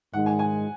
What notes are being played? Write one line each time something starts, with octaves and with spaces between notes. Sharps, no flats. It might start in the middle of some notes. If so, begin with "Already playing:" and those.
G#2 D#3 G#3 D#4 F#5
G#5
G#5